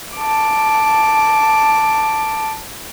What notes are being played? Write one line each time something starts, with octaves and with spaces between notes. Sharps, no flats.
A5 D6